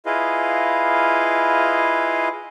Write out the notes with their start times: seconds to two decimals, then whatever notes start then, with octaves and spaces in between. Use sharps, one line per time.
0.06 E4 F4 G#4 B4 D#5 F5